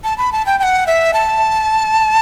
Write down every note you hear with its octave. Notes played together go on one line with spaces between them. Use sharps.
A5
B5
A5
G5
G5
F#5
E5
A5